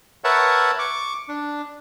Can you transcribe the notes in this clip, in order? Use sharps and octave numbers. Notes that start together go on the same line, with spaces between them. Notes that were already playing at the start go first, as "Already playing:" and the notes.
A#4 B4 C#5 E5 F#5 A5
C#6 D6
D4